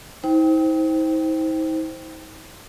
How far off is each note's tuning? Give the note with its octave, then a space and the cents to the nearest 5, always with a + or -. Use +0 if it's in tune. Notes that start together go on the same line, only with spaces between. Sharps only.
D#4 +45 C5 +0 G5 +0